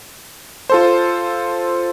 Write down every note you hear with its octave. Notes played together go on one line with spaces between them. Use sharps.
F4 A4 C5